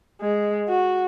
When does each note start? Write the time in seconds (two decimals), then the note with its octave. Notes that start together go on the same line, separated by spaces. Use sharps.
0.21 G#3
0.68 F#4